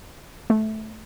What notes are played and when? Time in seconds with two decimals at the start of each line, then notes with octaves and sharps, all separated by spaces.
0.50 A3